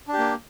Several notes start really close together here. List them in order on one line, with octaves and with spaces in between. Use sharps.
D4 G4 A#3